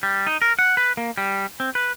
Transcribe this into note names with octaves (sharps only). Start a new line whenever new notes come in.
G3
D#4
A#4
F#5
B4
A#3
G3
C4
B4